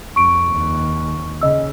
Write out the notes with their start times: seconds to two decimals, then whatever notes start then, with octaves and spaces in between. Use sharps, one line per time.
0.16 F2 C#6 D7
0.49 D#2
1.41 C#3 D#5 E6